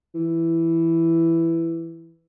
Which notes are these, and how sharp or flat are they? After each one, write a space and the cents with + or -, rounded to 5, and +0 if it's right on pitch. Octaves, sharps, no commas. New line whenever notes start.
E3 +5